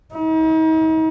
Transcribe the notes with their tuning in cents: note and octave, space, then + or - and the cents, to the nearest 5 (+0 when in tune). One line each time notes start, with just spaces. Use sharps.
D#4 +40